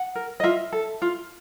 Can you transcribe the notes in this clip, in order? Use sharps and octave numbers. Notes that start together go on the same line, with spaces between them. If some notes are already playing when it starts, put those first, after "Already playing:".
Already playing: F#5
A#4
D#5
F4 E5
A4
F4